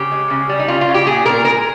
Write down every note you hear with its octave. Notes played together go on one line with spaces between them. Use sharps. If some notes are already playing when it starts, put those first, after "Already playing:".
Already playing: C#3 G4
G#3
C#3
G3
D#4
C#3 F4
F4
C#3
G4
A#2 G#4
A#2 A#4
G#3 A#4